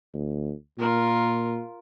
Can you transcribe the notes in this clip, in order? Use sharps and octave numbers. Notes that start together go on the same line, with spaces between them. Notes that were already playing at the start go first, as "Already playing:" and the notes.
D2
A#2 F4 A#4